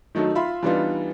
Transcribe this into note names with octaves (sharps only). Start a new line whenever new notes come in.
D#3 F#3 A3 D#4
F4 E5 B5 C6
E3 G3 B3 D4 D#4 F4